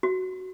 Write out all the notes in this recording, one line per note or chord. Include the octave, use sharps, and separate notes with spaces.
F#4